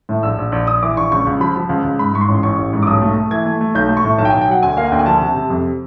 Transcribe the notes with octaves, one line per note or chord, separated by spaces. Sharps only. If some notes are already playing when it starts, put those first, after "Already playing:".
A2
A#1 E6
A#1
A#1
A#1 D#6
E3 D6
A#1 C#6
C#2 C#6
C#2
F3 B5
F3
C#2
C#2
G#2 B5
G#2 C#6
C6
A1
A1 C#6
A1
G#2
D6
B1 D#6
A3
A3
E3 G#6
A3
A3
B1 G6
A3
C#6
A2
B1 A5
G5
B1 G#5
G5
F#3 F#5
D2 G#5
A#3 F5
F#5
D2 G5
G#5
F3 A5
C3
C3
F2